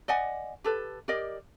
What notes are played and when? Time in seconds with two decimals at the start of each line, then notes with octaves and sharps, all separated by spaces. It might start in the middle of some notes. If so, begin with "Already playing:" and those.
0.08 D5 D#5 F#5 G#5
0.64 G4 A4 B4
1.08 G4 A#4 D5 D#5